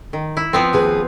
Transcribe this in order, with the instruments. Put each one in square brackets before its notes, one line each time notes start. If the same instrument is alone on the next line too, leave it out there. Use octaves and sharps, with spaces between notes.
[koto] D#3
E4
F3 B3 C4
[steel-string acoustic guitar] D#2 G#4 B4